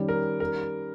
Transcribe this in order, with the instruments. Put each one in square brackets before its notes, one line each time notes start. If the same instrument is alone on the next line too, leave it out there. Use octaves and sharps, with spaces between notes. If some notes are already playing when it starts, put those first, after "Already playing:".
Already playing: [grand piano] D#3 G3 C#4
[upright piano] A#4
A#4